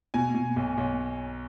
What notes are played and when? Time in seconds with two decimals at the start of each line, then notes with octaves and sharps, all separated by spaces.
0.14 B2 G#5
0.35 B2
0.56 B1
0.78 B1